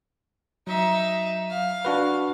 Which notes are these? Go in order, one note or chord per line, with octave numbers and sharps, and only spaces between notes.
F#3 D#4 E5
F5
D4 F#4 B4